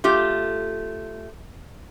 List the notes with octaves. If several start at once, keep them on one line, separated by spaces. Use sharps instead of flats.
A3 F4 G4